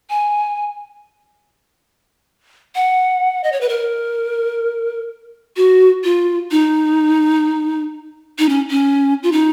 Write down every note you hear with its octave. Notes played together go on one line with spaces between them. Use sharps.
G#5
F#5
D#5
C#5
B4
A#4
F#4
F4
D#4
D#4
C#4
C#4
F4
D#4